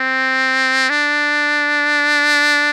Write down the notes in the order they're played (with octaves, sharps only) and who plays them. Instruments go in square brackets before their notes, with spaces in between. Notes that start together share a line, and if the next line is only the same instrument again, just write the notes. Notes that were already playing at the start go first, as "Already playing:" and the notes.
Already playing: [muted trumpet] C4
D4